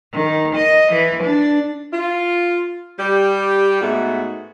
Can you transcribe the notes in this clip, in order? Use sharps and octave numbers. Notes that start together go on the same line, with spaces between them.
D#3
D#5
E3
D4
F4
G3 G4
G#2 G#3 A3 B3 F#4